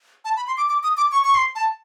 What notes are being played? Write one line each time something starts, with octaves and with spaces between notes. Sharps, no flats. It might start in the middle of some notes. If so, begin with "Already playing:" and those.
A5
B5
C6
D6
D6
D#6
D6
C#6
C#6
C6
A5